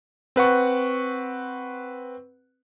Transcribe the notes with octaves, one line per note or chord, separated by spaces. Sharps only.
C4 B4 F#5 C#6